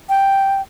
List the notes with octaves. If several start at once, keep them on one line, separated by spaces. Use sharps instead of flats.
G5